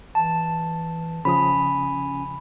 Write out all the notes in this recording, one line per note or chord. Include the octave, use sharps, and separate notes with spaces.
E3 A5
C#3 F3 C#4 G#5 B5 D#6